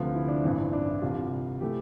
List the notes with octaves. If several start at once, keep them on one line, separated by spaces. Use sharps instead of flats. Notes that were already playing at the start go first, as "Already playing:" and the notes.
Already playing: D2 C3 F3 A3 B4
E4
D4
A1 G2 E3 C4
C4
D4
E4
C2 C3 G3 F4
E3 A3 G4